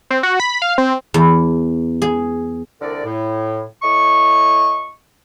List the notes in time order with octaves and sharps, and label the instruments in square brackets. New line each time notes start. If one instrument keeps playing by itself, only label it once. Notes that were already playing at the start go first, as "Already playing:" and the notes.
[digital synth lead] C4
F#4
B5
F5
C4
[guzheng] E2
G#4
[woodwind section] C2 D3 A#4 D5
A2
A2 D#5 C#6